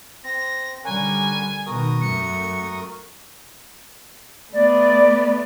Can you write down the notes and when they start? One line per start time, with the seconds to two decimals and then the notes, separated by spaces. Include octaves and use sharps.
0.24 C4 A#6
0.84 D3 G3 C#4 A#4 F#5 G#5
1.66 B2 D#3 F#4 A#4 D#6
2.01 F#2 A3 C#7
4.52 A3 B3 D5